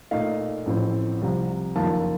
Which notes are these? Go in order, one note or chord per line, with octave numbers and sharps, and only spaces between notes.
A#2 A3 D#4 F5
A1 A2 F3 C4
C2 C3 F3
F#1 F2 D#3 A#3 F4 A5